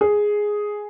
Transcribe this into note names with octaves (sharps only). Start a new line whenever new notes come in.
G#4